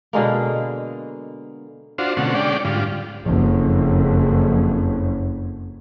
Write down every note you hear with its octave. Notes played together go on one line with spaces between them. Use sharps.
B2 D3 G#3 A#3
D4 F4 F#4 C5
B2 D3 A3 C4 C#4 F#5
G#3 C#4 D4 D5 G5
G#2 D3 G3 F4
F#1 F2